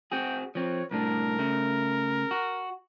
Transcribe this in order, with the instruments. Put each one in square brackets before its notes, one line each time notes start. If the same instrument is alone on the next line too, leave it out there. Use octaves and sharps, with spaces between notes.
[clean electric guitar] C4 F#4 G#4 [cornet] G5
[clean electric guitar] F3 C4 [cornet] C#5
[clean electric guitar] C2 A2 D4 [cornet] A#4
[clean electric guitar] C#3 A3
F#4